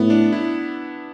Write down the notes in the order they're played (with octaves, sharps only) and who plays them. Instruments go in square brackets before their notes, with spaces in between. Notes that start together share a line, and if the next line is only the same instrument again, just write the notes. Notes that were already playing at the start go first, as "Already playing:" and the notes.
Already playing: [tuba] A2 [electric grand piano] B3
[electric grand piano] D4
E4